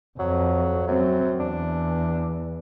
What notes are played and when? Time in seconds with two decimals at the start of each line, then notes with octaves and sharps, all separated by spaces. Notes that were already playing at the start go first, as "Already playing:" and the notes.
0.19 F2 F#3
0.88 F#2 F#3 C4
1.40 E2 D4